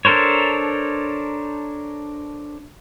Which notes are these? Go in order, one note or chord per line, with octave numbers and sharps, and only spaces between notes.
D4 A4 A#4 C5 C#5